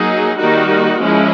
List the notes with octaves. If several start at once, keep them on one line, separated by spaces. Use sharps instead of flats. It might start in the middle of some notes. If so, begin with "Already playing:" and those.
Already playing: F#3 A#3 D#4 G#4
D#3 G3 A#3 D#4 F#4
F3 G#3 C#4 E4